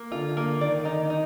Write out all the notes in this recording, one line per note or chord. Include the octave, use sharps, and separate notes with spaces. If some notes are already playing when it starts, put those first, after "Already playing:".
Already playing: A#3
D3 F4
A#3
D#3 D5
D#4
D#4